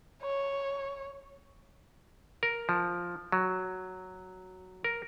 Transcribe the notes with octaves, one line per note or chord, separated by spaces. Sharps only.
C#5
A#4
F3
F#3
A#4